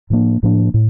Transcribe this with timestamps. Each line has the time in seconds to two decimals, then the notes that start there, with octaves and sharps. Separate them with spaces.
0.10 A2 F3 A#3 D4
0.43 A2 F3 A#3 D4
0.74 A2